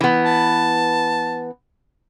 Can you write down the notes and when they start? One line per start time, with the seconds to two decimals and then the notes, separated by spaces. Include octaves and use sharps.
0.01 E3 B3
0.25 A5